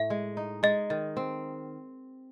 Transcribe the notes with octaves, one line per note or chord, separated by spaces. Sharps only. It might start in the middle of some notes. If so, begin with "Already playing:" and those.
Already playing: A2 E5
G#3
D#4
G#3 D#5
D#3 D#5
C4